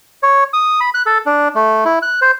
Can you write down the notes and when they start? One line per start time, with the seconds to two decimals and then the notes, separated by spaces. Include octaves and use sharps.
0.23 C#5
0.53 D#6
0.81 B5
0.94 F#6
1.06 A4
1.26 D4
1.55 A3
1.85 E4
2.02 F#6
2.21 C5